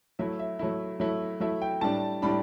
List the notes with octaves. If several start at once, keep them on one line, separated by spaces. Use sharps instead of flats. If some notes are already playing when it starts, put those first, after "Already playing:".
F#3 A3 E4 E5
E5
F#3 A3 E4
F#3 A3 E4
F#3 A3 E4 E5
G5
A2 G3 D4 A5
A2 G3 D4 B5